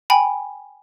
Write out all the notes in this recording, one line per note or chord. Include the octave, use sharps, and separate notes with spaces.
G5 G#5 B5